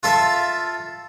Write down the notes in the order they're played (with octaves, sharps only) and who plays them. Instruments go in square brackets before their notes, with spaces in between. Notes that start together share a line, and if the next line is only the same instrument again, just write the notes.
[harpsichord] F4 A4 E5